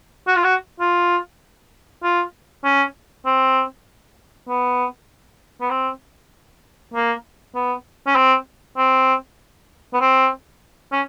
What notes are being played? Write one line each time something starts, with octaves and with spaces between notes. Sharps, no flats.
F#4
F4
F#4
F4
F4
C#4
C4
B3
B3
C4
A#3
B3
C#4
C4
C4
B3
C4
C#4